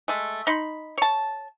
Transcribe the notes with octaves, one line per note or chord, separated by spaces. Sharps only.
G#3 A3
D#4 B5 C6
C#5 A5